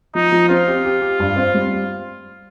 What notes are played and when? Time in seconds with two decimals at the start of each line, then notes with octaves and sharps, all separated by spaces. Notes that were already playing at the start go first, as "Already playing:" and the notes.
0.15 F3 D#4
0.32 F3
0.49 C4 F4
0.67 G4
0.85 G4
1.01 G4
1.19 G2
1.36 C4
1.54 G3